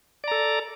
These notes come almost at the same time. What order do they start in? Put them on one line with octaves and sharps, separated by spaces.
D5 A#5 A4